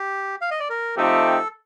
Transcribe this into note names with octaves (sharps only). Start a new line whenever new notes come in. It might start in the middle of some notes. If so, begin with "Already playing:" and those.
Already playing: G4
F5
D#5
D5
A#4
C3 F3 A3 D#4 G4 A4